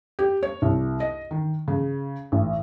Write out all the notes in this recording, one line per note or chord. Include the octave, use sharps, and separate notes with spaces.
G4
C#5
C2
D#5
D#3
C#3
A1